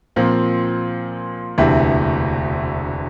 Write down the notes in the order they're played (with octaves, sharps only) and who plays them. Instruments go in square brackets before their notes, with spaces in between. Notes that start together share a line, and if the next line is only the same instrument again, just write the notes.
[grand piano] A#2 F3 C4
E1 D2 C3 E3